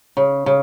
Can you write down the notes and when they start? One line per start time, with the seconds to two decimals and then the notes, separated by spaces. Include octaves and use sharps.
0.17 C#3
0.46 C#3